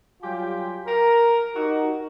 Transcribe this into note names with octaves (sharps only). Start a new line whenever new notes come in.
F#3 G3 F4 G4 G5 G#5
A#4
D#4 F#4 G4